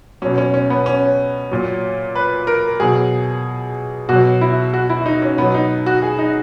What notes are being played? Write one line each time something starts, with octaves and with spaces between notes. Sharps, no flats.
B2 F#3 C#4
C#4
C#4
B3
C#4
A#2 F#3
B4
A#4
B2 F#3 G#4
B2 F#3 F#4
E4
F#4
E4
D#4
C#4
B2 F#3 B3
D#4
F#4
G#4
D#4